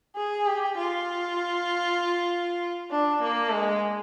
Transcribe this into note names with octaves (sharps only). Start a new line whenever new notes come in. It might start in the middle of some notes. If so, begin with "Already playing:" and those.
G#4
G4
F4
D4
A#3
G#3